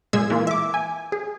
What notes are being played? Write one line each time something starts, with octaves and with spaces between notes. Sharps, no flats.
A#2 G#3 G#4 E6 G#6
E3 A#3 F4
E5 D6
G#5
G#4